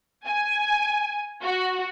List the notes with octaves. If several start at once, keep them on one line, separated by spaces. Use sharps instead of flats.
G#5
F#4